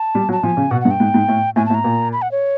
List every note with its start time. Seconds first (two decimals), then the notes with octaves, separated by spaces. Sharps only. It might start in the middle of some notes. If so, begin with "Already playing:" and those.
Already playing: A5
0.15 G3
0.29 F#3
0.32 A5
0.43 F3 G#5
0.57 C#3
0.71 B2 F#5
0.81 F#5
0.85 G2
0.91 G5
1.00 G#2
1.14 G#2
1.28 A2
1.56 A2 G#5
1.66 A5
1.70 A2
1.75 A#5
1.84 A#2
2.13 B5
2.22 F#5
2.32 C#5